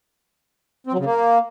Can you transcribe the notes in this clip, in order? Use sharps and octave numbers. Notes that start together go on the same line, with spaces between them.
C4
F#3
C#3
A#3